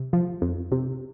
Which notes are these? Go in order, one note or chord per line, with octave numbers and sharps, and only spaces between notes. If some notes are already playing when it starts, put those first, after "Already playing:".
Already playing: C3
F3
F2
C3